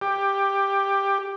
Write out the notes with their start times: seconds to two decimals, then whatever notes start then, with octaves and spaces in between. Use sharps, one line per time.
0.01 G4